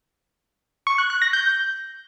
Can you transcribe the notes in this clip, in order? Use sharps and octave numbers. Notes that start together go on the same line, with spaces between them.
C#6
F#6
F#6
A#6
G6